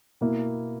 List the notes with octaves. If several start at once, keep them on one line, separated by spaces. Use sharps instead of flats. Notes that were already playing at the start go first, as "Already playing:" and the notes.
B2 A#3 E4